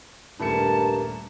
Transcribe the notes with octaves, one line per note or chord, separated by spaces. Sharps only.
D#1 G2 A3 A#4 A5 C#7